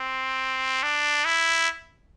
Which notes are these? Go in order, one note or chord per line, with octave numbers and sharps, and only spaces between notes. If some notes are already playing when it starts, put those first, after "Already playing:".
Already playing: C4
D4
E4